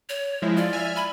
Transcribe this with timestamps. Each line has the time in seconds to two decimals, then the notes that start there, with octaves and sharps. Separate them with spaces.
0.09 C#5
0.42 F3 G#3 E4
0.57 F4 D5
0.73 E5 G#5 F6
0.96 B5